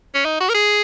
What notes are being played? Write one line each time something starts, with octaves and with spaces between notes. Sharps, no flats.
C#4
D#4
F#4
A#4
G#4